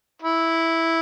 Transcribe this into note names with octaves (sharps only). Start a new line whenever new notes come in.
E4